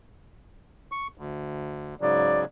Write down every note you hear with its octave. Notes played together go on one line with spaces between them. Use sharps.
C#6
D2
G#2 C#3 F#3 D5